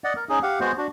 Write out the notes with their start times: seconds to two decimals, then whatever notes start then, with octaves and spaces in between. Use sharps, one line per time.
0.04 D5 D#5 F#5
0.16 A#4
0.29 C#4 D#4 G#4
0.43 G4 F5 F#5
0.60 G#3 B3 F#4 C5
0.78 D4 F#4